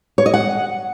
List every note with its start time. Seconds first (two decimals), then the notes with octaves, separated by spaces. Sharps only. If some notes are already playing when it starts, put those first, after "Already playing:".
0.18 C#5
0.26 D#5
0.34 F#5